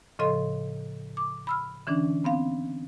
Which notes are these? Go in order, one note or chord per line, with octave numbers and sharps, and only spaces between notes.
A2 C#3 F3 A4 D#5 C6
D6
B5 E6 F6
D3 E3 C#4 D4
B3 C4 F5